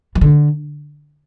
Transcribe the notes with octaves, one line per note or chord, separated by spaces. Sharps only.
E3
D3